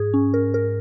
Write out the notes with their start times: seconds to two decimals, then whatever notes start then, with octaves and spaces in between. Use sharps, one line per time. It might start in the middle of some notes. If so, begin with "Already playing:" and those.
Already playing: G#2 G#4
0.14 C#4
0.34 A#4
0.54 A#4